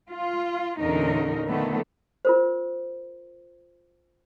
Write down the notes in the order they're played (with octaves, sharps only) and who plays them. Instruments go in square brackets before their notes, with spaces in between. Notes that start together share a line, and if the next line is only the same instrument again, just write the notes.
[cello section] F4
E2 A#2 D3 C#4 D#4 A#4
D3 D#3 F3 A3 B3
[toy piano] F4 A#4 C5